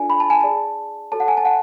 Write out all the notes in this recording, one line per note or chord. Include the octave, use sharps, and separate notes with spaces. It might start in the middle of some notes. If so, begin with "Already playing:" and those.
Already playing: D4 F4 A4 D5 G#5
B5
A5
G#5
G#4 D5 A5
F#4 A4 C#5 A5
F#5
G#5
A5
F#5